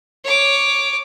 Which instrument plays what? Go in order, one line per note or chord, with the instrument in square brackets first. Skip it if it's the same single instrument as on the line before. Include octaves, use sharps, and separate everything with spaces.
[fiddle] C#5 D6